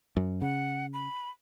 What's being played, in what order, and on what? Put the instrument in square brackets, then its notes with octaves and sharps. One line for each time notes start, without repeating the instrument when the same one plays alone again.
[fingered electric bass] F#2
[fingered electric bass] C#3 [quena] F#5
[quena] B5